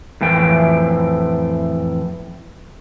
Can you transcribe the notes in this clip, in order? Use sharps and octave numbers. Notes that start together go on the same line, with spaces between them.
F2 A2 E3 G5